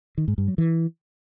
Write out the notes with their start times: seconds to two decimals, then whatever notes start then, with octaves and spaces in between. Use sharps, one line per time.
0.18 D#3
0.28 G#2
0.38 G2
0.48 F#3
0.58 E3